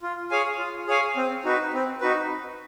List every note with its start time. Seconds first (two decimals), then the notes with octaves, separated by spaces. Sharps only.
0.02 F4
0.31 G#4 C#5 F5 G#5
0.59 F4
0.87 G#4 C#5 F5 G#5
1.17 C4
1.44 D#4 F#4 B4
1.73 C4
2.01 D#4 F#4 B4